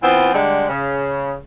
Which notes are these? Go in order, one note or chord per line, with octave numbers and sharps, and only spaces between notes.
E3 B3 C4 F4
D3 G3 G#3
C#3